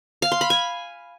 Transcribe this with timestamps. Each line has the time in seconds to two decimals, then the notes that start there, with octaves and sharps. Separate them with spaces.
0.22 F5
0.32 C6
0.41 B5
0.50 G#5